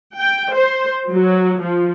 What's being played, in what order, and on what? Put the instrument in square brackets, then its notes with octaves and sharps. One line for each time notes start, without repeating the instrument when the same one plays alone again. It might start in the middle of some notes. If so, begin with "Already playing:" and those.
[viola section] G5
C5
F#3
F3